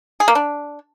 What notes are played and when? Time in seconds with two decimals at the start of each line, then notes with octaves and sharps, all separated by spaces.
0.20 G#4
0.28 A#3
0.35 D4